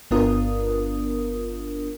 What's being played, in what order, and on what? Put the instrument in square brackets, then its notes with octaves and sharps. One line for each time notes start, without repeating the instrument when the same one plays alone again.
[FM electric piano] G1 B3 D4 F4 A#4 D#6